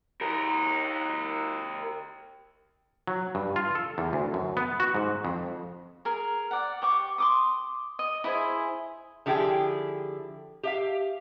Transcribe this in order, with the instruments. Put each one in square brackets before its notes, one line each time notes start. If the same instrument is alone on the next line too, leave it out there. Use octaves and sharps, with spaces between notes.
[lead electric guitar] G4 A#4
[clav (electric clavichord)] F#3
G2
F4
A4
E2
D2
F#2
B3
F#4
G#2
F2
[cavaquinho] G#4 A#4
D5 F#5
G4 C#6 D6
C6 D6 D#6
D#5
E4 G#4 C5 G#5
[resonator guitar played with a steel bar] D3 F3 E4 G4 G#4 G5
G4 E5 F5